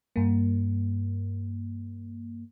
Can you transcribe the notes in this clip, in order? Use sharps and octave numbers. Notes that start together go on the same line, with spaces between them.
G2 A#3